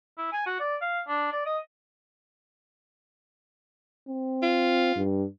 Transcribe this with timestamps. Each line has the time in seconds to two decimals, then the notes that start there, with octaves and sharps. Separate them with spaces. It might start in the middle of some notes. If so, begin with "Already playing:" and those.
0.18 E4
0.33 G#5
0.46 F#4
0.60 D5
0.82 F5
1.08 D4
1.32 D5
1.46 D#5
4.08 C4
4.42 F4
4.96 G2